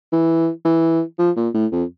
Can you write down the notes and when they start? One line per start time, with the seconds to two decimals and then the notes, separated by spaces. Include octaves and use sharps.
0.12 E3
0.65 E3
1.19 F3
1.36 A#2
1.54 A2
1.72 F2